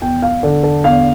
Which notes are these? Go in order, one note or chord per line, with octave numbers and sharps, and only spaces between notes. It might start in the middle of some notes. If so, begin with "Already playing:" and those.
E2 G5
F5
D3 A4
A4
E2 F5